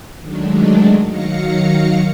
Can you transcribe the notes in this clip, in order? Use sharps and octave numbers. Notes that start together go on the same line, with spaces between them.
D#3 F#3 G#3 A3 D4
D#3 F#3 F5 A#6 C#7